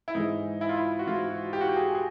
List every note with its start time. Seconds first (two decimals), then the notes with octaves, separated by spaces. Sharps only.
0.08 E4
0.15 G#2 E3 G#3 D#4
0.61 E4
0.69 F4
0.77 E4
0.99 F#4
1.07 G#2 E3 G#3 F4
1.30 F#4
1.53 G4
1.61 F#4
1.69 G4
1.76 G#4
1.95 G#4